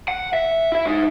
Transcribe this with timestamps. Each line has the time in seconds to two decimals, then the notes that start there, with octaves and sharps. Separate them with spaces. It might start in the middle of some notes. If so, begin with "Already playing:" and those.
0.08 F#5
0.34 E5
0.72 E4 E5
0.86 G#2 D#4